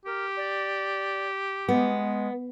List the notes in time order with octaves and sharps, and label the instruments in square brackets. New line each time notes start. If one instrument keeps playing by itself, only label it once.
[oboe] G4 [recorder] A#4
[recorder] D5
[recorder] G#3 [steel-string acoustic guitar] B3